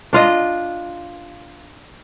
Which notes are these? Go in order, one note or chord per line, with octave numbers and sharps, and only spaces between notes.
D4 F4 D#5